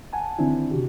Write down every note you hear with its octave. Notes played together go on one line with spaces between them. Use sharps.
F#5 G#5 A5
D3 D#3 C4 D4 E4
C3 F#4 G4